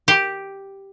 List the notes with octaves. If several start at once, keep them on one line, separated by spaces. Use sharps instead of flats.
G4